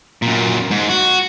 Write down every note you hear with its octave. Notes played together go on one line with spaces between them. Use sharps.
F#2 A#2
G#2
F#4